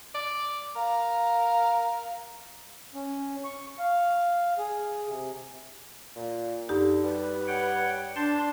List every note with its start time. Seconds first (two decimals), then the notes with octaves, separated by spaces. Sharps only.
0.15 D5
0.76 A#4 F5
2.95 C#4
3.44 C#6
3.79 F5
4.59 G#4
5.08 C3
6.15 A#2
6.69 F#2 D3 D#4 G4
7.04 G3 B4
7.48 C#5 F#5 G5
8.16 D4 A5 C6 G6